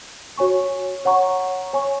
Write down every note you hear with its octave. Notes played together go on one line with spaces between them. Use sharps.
F#4 C#5 G#5 C#6
C#5 F#5 A#5 C#6
C#5 G#5 C#6